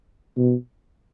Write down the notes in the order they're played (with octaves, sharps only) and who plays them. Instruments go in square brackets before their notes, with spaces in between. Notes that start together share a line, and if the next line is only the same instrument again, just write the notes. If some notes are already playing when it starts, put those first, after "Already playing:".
[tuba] B2